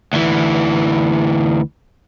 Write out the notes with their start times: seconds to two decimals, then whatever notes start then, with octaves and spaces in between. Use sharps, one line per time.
0.13 D2 E3